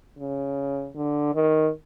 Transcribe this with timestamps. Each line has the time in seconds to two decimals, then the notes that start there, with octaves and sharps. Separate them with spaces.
0.18 C#3
0.95 D3
1.34 D#3